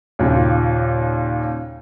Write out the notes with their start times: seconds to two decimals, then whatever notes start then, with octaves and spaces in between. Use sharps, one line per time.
0.19 D#2 A#2 C#3